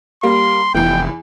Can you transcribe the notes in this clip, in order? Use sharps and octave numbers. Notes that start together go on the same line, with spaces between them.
G3 A#3 C6
F1 E2 E3 G5